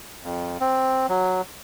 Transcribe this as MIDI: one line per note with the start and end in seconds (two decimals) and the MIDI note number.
0.24 0.57 41
0.60 1.06 60
1.09 1.41 54